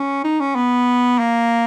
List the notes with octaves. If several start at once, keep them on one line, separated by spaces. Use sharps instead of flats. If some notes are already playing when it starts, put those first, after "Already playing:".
Already playing: C#4
D#4
C#4
B3
A#3